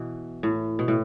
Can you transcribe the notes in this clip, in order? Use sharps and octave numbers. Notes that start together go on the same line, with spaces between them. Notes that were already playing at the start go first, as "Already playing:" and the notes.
Already playing: B2 E3
A2
B2
A2